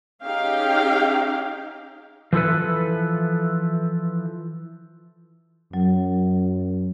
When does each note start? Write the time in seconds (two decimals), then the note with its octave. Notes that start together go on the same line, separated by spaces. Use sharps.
0.24 C#4 D#4 G4 G#4 F5 G5
2.33 E3 F3 E4 A4 B4
5.73 F#2 F#3